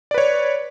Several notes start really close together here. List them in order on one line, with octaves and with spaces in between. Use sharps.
D5 B4 C#5